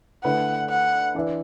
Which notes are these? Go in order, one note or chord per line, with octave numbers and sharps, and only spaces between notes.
D3 A3 E4 B4 F#5
F#5
E3 D4 B4 E5